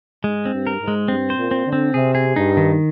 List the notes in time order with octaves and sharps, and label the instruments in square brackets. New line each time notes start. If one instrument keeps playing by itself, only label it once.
[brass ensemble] G#2 [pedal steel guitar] G#3
[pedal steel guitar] C4
[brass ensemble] G2
[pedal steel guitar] A#4
[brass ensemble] G#2
[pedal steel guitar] G#3
[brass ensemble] G2 [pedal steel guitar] C4
[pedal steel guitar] C5
[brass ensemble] A#2
[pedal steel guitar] C4
[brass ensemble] D3
[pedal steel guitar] C4
[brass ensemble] C3 [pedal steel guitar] G#4
[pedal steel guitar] G#4
[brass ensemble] G2 [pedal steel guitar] D#4
[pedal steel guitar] D#3